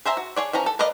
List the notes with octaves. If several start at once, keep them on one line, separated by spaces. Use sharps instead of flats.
G#4 C5 E5 A#5
F#4
G#4 C#5 D5
E3 F3 C#4 A#5
A4
A#4 B4 D5 D#5 F5